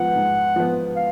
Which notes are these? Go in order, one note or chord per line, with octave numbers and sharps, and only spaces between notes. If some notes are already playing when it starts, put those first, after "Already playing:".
Already playing: G#2 F3 B3 F#5
G#2
F3 B3
F5